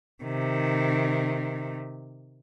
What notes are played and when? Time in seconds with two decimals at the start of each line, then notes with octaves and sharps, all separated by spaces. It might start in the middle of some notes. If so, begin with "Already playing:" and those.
0.24 C3 D#3